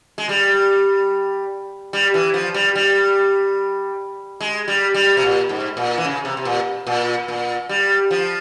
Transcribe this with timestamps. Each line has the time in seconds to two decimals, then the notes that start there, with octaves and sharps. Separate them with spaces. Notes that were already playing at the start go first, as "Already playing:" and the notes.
0.18 G#3
0.29 G3
1.93 G3
2.14 E3
2.34 F3
2.54 G3
2.75 G3
4.41 G#3
4.68 G3
4.94 G3
5.17 C3
5.23 A#2
5.49 G#2
5.77 A#2
5.98 E3
6.04 C#3
6.25 C3
6.37 C3
6.45 A#2
6.87 A#2
7.28 A#2
7.69 G3
8.11 F3